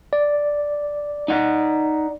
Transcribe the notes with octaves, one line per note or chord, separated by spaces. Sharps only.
D5
D#4 F#5